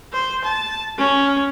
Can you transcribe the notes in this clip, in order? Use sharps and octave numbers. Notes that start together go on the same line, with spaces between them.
C5
A5
C#4